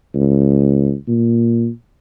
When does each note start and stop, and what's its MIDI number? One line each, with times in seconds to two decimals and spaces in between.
0.14 0.94 37
1.08 1.68 46